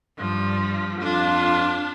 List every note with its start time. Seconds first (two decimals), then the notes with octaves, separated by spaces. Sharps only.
0.18 G2 F3
1.01 F2 D4 F4